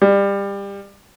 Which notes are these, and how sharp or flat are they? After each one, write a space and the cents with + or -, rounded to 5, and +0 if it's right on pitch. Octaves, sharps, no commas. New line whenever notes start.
G3 +25